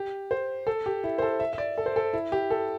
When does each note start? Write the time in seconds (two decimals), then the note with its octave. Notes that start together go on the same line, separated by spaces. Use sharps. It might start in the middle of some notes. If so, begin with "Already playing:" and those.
Already playing: G4
0.31 C5
0.67 A4
0.86 G4
1.04 E4
1.18 C5
1.22 A4
1.40 E5
1.53 E5
1.58 D5
1.78 A4
1.86 C5
1.96 A4
2.13 E4
2.32 G4
2.50 A4